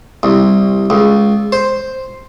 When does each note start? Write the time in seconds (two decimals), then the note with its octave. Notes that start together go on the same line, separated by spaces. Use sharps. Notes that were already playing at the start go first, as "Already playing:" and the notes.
0.23 C2
0.90 C#2
1.52 C5